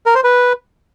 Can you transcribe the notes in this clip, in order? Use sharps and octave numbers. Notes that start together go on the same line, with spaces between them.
A#4
C5
B4